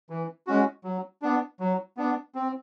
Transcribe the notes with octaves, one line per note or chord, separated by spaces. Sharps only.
E3
G#3 C#4 F#4
F#3
B3 D4
F#3
B3 D4
C4